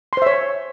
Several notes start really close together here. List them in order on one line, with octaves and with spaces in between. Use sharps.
C6 C5 E5 C#5